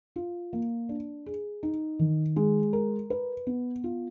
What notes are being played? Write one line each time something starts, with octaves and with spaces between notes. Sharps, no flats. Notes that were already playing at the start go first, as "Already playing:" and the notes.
F4
A#3
D4
G#4
D#4
D#3
G#3
A#4
B4
B3
F4